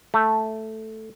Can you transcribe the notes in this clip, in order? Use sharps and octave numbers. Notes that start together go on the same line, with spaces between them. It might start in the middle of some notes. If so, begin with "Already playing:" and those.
A3